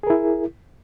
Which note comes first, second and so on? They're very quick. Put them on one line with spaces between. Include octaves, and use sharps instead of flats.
G#4 A#4 E4